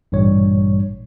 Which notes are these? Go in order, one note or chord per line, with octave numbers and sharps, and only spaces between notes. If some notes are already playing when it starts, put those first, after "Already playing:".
A1 G2 A#2 G3 C#5